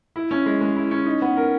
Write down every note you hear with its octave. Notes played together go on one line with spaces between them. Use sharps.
E4
C#4
G#3
G#3
E4
C#4
D#4
B3
A#4